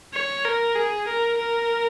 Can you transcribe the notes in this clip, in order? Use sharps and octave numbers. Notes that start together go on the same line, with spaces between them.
C#5
A#4
G#4
A#4
A#4